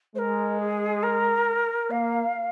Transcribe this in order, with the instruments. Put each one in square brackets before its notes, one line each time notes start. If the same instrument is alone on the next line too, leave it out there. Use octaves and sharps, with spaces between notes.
[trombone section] G#3 [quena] A#4 C5
[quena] G#4
A#4
[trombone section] A#3 [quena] F5